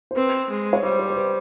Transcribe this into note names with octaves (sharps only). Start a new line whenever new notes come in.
C5
C4 B4
G#3
C#5
G3 C5
C5
C5
B4